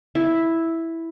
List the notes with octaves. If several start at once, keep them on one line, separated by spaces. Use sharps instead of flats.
E4